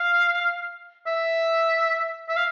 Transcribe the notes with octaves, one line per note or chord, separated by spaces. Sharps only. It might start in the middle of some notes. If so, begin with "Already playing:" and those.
Already playing: F5
E5
E5
F5